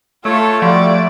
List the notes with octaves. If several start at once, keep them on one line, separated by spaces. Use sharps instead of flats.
A3 F4 A4 C#5
F3 G3 F#4 D5